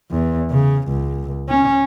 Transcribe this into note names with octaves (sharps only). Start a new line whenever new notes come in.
E2
C#3
C#2
C#4